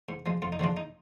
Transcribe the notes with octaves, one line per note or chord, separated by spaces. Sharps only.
G#2
F3 G#3
F2 F4
D#4
D3 F3 G#3 D4 F4
D#4